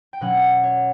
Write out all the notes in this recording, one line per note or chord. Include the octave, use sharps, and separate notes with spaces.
G5
B2 F#3 C#4 F#5
C#5